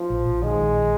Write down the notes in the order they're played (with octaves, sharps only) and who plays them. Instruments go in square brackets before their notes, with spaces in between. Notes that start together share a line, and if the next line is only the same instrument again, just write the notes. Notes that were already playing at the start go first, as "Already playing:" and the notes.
Already playing: [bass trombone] F3
[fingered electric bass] A#1
A#1
[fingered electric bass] D#3 [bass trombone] G#3
[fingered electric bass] A#1